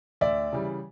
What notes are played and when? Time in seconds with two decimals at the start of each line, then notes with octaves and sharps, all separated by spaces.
0.21 D2 D5 E5
0.53 C#3 E3 G3